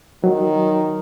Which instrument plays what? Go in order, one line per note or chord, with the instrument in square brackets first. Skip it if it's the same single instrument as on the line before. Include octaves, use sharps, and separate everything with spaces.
[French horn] D#3 [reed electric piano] F#3